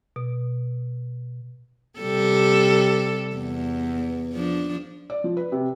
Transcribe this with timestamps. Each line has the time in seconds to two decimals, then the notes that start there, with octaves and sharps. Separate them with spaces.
0.16 B2
1.99 C3 G3 A4
3.36 E2
4.33 F3 D4
5.10 D5
5.24 F3
5.37 B4
5.52 C3